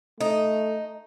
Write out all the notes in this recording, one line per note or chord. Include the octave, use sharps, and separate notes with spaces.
A3 D#4